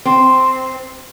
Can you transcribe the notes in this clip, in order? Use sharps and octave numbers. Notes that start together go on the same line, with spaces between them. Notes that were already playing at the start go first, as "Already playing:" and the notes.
C4